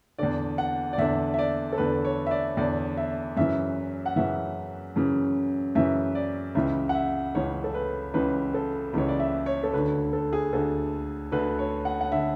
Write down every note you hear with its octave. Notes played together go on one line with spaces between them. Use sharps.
E2 D3 D5
F#5
D5
E2 D3 E5
E5
D5
A4
E2 D3 B4
C#5
E5
D5
E2 D3 D5
E5
F#2 C#3 E3 E5
F#5
F#2 C#3 E3 E5
F#2 C#3 E3
F#2 C#3 E3 E5
D5
C#2 C#3 E3 E5
F#5
E5
C#2 C#3 E3 C#5
A4
B4
C#2 C#3 E3 B4
A4
C#2 C#3 E3 C#5
D5
E5
C#5
A4
D2 D3 B4
A4
G#4
D2 D3 A4
D2 D3 B4
C#5
F#5
F#5
D3 E5